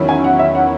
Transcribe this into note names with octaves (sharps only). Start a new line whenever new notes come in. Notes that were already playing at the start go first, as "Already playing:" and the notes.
Already playing: E2 D#3 F#3 C#4 E4
G#5
F#5
E5
F#5